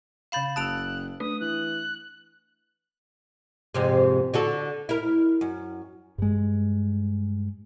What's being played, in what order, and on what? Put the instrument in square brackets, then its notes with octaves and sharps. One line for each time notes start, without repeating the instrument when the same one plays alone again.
[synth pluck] C#3 G6 E7 [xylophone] F5 B5 A6
[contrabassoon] F#1 [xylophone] A5 D7 F7 [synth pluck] D#6 E6 [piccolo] F#6
[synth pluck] A3 D4 B4 [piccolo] D#6
[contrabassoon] E3 [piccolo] F#6
[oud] F2 G#2 C3
D3 F#4 A4
E4 A#4
F#2
[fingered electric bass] G2 G#3